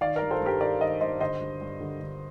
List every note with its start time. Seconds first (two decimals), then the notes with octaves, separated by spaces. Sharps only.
0.01 D#3 D5 F5
0.16 G2 A#4 D5
0.31 A4 C5
0.41 G2
0.46 G4 A#4
0.61 D#3 A#4 D5
0.81 D#3 C5 D#5
1.01 G2 C5 D#5
1.20 D3 C5 D#5
1.40 G2
1.61 G2
1.81 D3
2.01 D3